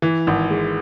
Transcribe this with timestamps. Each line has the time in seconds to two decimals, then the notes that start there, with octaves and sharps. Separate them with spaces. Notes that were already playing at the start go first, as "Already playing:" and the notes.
0.02 E3
0.27 G#1
0.50 G#3